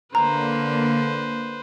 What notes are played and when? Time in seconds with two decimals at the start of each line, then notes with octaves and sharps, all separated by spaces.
0.15 D3 A#3 B4 C5 A#5